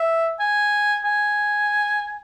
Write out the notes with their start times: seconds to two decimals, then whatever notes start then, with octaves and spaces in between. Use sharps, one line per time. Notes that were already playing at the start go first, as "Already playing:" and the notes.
Already playing: E5
0.40 G#5
1.05 G#5